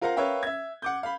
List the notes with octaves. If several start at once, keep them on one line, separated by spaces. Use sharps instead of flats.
F4 A#4 C5 F5 F#5 A#5
A#4 B4 C#5 E5 F5 G5
E5 G#6
F#5 D6 G6
F5 B5